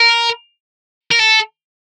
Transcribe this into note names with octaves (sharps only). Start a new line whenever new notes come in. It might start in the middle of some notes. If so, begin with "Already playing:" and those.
Already playing: A#4
A#4
A4